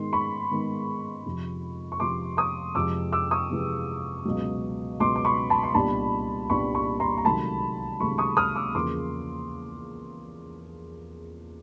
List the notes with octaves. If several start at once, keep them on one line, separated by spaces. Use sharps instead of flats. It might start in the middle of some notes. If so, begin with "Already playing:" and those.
Already playing: G#2 D#3 G#3 B3 C6
B5 C#6
G#2 D#3 G#3 B3
F2 C3 F3
C#6
F2 C3 F3 C6 D6
C#6 D#6
F2 C3 E3 G#3 D6 E6
D6 E6
C#6 D#6
F2 C3 E3 G#3
C#2 B2 F#3
C#2 B2 F#3 C6 D6
D6
B5 C#6
A5 B5
C6
C2 A#2 G3 B3 D4 A5 B5
C2 A#2 G3 B3 D4 B5 C#6
B5 C#6
A#5 C6
A#5
C#2 C3 D#3 F#3 A3 A5 B5
C#2 C3 D#3 F#3 A3 B5 C#6
C#6 D#6
D#6 F6
D6 E6
E2 C#3 F3 A#3 C6 D6